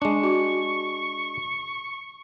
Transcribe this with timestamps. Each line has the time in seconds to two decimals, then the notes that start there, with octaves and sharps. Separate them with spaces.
0.02 G#3 D4 C#6
0.23 F#4